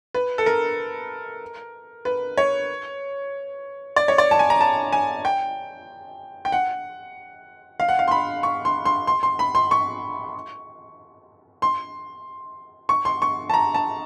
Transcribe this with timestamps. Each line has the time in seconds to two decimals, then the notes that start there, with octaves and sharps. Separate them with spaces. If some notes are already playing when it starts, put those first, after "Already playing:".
0.14 B4
0.38 A4
0.46 A#4
2.05 B4
2.38 C#5
3.96 D5
4.08 C#5
4.18 D5
4.31 A5
4.39 G#5
4.50 A#5
4.61 A5
4.93 G#5
5.25 G5
6.45 G5
6.52 F#5
7.80 F5
7.89 F#5
7.99 F5
8.08 C6
8.11 B5
8.43 C#6
8.65 C6
8.85 C6
9.07 C6
9.23 C6
9.39 B5
9.55 C6
9.71 C#6
11.62 C6
12.89 C#6
13.05 C6
13.22 C#6
13.50 A5
13.54 A#5
13.74 A5